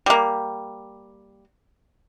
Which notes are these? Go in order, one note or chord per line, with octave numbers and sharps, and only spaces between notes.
G3 A#3